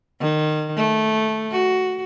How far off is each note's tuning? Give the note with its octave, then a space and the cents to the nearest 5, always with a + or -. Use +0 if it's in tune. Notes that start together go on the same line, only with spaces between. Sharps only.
D#3 -25
A3 -10
F#4 +5